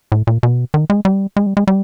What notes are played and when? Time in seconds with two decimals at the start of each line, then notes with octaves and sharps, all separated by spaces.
0.12 A2
0.27 A#2
0.43 B2
0.74 D#3
0.90 G#3
1.05 G3
1.37 G#3
1.46 G3
1.57 G#3
1.67 G3